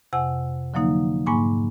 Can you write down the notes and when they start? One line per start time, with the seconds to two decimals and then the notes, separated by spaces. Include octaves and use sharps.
0.13 F2 C3 F#5 G#5 E6
0.74 D3 F3 F#3 A#3 D#4
1.26 G#2 A#3 G#5 B5 C#6 D6